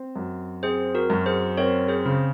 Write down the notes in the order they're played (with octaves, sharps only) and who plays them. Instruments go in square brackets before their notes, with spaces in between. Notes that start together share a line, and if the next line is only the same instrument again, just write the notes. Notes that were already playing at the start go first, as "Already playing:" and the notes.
Already playing: [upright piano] C4
F#2
[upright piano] C4 [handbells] G#4 C5
[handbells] F#4 A#4
[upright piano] F#2
[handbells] G#4 C5
[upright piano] C4 [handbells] A#4 C#5
[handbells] G#4 C5
[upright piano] C#3